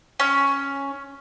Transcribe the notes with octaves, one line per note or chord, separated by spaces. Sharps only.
C#4